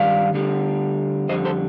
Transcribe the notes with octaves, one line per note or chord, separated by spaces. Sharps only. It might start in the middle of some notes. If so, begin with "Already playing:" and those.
Already playing: G2 D#3 G3 D5 F5
D2 D3 G3
F2 D3 G3 C5 D#5
A4 C5